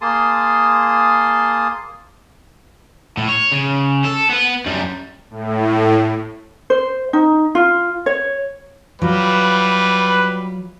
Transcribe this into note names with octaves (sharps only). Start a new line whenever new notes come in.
A#3 G#4 A5 C6 D#6
A2
C#5
C#3
A4
B3 B4
F#2 G3
A2
C5
D#4
F4
C#5
F#3 G3 F4 B4